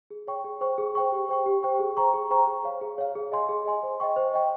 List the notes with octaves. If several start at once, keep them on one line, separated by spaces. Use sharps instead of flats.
G#4
C#5 G5 C#6
G#4
C5 G5 C#6
G#4
C5 G5 C#6
G4
C5 G5 C#6
G4
C5 G5 C#6
G#4
C5 G5 A#5 C#6
G#4
C5 G5 A#5 C#6
G#4
C#5 F5
G#4
C#5 F5
G#4
D#5 G#5 C6
G#4
D#5 G#5 C6
C5
D#5 G5 C#6
C5
D#5 G5 C#6